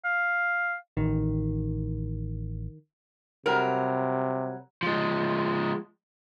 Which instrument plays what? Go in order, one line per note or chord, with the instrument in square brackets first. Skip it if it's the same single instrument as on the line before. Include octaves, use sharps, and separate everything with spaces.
[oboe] F5
[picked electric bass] A1 [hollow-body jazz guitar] D#3
[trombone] C3 [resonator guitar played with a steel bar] F#3 G3 A#4
[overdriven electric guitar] F3 G#3